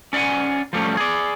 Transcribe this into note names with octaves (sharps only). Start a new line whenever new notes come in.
C#4 D5 E5 F#5 G#5
F3 G3 A3 C#4
G#4 D5